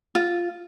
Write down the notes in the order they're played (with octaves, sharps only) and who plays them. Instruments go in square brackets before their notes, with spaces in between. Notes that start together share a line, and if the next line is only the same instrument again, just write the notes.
[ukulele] F4